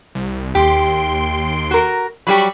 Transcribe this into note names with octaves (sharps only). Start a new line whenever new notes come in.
C2
D#2 G4 C6 D7
F#4 A#4
F#3 G3 G4 B5 C#6